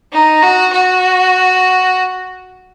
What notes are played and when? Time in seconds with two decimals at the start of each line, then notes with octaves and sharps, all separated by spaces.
0.12 D#4
0.43 F#4
0.73 F#4